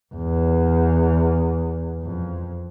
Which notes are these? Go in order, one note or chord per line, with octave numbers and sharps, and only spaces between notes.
E2
F2